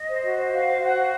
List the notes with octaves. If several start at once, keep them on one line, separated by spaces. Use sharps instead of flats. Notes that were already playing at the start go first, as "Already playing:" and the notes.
Already playing: D#5
C5
F#4
C5
F#4 F5
C5
F#4 F#5
C5